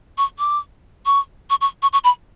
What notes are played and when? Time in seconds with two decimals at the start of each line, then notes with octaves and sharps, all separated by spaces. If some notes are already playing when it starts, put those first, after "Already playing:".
0.18 C#6
0.39 D6
1.06 C#6
1.50 C#6
1.61 C#6
1.82 C#6
1.93 C#6
2.04 B5